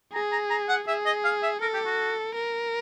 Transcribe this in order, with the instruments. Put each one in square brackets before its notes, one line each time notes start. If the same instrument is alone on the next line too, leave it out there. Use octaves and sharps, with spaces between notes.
[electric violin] G#4 [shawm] A#5
[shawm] A#5
A#5
F#5
[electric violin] G#4 [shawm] E5
[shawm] D#5
F5
E5
[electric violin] A4 [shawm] A#4
[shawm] G4
F#4
[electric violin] A#4